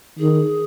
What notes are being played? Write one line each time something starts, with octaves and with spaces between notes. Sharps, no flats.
D#3 G#4